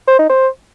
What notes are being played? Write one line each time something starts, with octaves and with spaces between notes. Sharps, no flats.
C5
D#4
C5